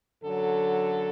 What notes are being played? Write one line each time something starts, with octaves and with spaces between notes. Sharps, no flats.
F#2 D3 F#3 A4